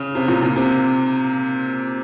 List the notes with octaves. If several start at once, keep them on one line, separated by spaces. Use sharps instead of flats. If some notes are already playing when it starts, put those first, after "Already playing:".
Already playing: C#3
C3
A#2
A#2
C3